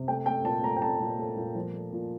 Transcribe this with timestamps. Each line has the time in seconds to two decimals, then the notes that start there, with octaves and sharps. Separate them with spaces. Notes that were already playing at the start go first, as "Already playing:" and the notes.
Already playing: C3
0.08 A3 G5
0.26 A3 G5
0.44 A#2 A5
0.63 A3 A#5
0.77 G5
0.82 A3 A5
1.00 A#2
1.19 A3
1.36 A#2
1.55 F3
1.73 A3
1.93 A#2